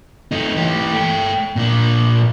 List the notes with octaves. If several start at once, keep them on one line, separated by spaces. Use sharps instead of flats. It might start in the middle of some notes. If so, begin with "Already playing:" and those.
A3 D#4
E3 G4
A3 G5
A#2 D4